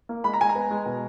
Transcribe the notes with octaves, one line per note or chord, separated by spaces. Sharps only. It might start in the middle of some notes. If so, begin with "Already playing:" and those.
A#3
G#3 B5
A#5
G#3 G#5
A#5
B3
G#3
B2